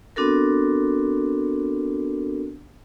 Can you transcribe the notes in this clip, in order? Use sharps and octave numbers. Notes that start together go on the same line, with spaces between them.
B3 C4 D4 F#4 A4 A#4